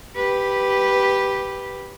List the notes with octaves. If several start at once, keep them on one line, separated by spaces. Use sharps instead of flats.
G4 B4